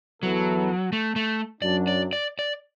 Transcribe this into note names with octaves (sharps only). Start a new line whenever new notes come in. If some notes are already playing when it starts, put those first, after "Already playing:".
E2 E3 F#3 B3 E4 A4
A3
A3
F#2 F#3 D4 D5
D5
D5
D5